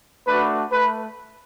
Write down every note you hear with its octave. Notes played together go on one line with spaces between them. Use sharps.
A3 D4 F#4 B4
A3 B4